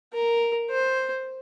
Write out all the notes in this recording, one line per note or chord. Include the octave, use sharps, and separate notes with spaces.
A#4
C5